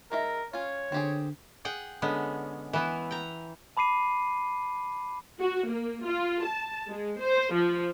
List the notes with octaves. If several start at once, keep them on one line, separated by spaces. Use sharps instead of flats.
G#3 D#4 A#4 E5
C#4 F4 C#5
D3 C4 G4 G#4
G#4 F#5 G5
D3 G#3 B3 C#4
E3 B3 E4
G5 A#5
A5 B5 D6 C7 D#7
F#4
A#3
F4
A5
G#3
C5
F3